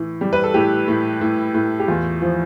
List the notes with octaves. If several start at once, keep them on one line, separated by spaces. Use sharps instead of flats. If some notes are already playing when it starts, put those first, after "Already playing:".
Already playing: A2 E3
G3
B4
A4
A2 G4
A2
A2
A2
G4
E2 F4
F3